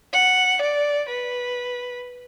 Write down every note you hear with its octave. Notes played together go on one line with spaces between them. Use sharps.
F#5
D5
B4